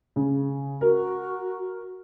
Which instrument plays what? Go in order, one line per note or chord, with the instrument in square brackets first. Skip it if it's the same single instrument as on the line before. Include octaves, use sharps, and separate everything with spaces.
[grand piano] C#3
[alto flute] F#4 [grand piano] A#4